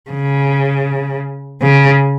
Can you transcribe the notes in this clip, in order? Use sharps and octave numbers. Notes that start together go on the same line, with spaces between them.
C#3
C#3